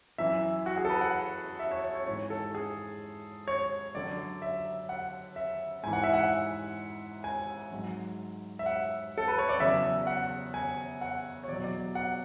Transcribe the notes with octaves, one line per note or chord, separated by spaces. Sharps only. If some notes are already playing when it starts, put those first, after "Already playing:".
F#2 E3 E5
F#4
G#4
A4
B4
F#5
E5
C#5
C#5
C#5
G#2 E3 C#5
A4
G#4
C#5
F#2 D3 F#3 D5
E5
F#5
E5
G#2 E3 G#5
F#5
E5
F#5
G#5
G#2 F#3
E5
F#5
A4
B4
C#5
D5
E2 C#3 F#3 E5
F#5
G#5
F#5
C#5
E2 B2 F#3 D5
D5
F#5